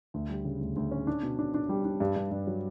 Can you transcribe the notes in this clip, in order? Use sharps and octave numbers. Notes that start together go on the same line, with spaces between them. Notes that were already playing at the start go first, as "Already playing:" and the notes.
D2
G3
C#3
D2
D2
C#4
D4
B2
D4
D4
G3
D4
G2
G2
G2
F#3